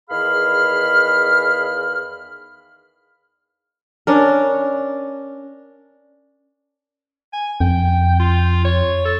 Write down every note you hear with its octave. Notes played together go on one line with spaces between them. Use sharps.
E2 D#3 G#4 F5 B5 F6
C#4 D4 A#4
G#5
F2 G5
F4
C#5
A4